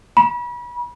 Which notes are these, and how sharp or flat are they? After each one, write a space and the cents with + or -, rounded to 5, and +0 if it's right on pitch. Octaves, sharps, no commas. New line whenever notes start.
B5 -35